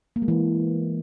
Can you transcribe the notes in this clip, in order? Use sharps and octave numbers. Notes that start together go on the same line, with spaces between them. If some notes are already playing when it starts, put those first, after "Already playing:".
A#3
G#3
E3